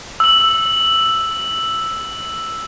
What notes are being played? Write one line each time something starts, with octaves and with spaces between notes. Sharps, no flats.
E6 F#7